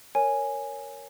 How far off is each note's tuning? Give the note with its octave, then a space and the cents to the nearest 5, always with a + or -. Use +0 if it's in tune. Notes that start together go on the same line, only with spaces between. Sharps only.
A#4 +0 C#5 +0 G#5 +0